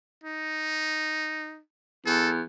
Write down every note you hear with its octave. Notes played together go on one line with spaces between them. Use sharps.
D#4
E2 A4